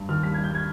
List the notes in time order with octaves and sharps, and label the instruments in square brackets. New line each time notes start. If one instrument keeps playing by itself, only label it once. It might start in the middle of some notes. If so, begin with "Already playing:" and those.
Already playing: [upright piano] G2
D#2 F6
G3 B6
G3 G#6
G6
G3 G#6